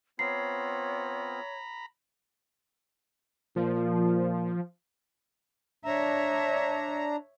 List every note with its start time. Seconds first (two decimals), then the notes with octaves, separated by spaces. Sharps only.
0.19 B3 C4 F4 C#5 A#5 B5 C7
3.56 A#2 F3
5.85 D4 C#5 E5 A#5